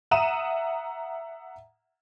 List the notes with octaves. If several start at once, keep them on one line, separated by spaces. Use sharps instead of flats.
E5 F#5 A#5 D#6 D#7 E7